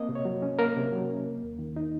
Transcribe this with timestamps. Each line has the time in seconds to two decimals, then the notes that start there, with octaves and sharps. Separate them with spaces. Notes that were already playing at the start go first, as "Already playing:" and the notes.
Already playing: A#3 C4 D#5
0.09 C3
0.15 C#5
0.25 F#3
0.42 C#4
0.59 A#3 A#4
0.76 C3
0.92 F#3
1.09 C#4
1.25 A#3
1.43 D#2
1.59 D#3
1.76 D#4